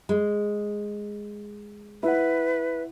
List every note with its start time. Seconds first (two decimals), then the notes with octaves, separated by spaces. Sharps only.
0.09 G#3
2.03 E4 B4 F#5